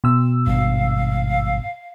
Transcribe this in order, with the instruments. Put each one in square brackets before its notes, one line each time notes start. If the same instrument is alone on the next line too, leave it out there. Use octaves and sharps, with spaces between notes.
[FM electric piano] B2 E6
[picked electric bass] G#1 G2 [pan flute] F5